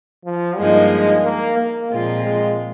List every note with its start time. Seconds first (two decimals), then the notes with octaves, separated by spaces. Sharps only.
0.25 F3
0.58 G2 F3 G#3 A#3 D#4
1.24 A#3
1.58 A#3
1.91 A#2 F3 G#3 C4 F4
2.24 G#3